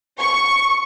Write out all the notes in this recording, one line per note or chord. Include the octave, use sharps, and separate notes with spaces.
C#6